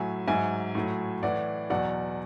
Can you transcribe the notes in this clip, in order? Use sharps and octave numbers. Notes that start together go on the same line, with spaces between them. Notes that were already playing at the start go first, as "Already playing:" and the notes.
Already playing: A2 F#3 E5 G#5
G#2 F#3 E5 G#5
A2 F#3
A2 E3 D5 F#5
E2 B2 F#3 D5 F#5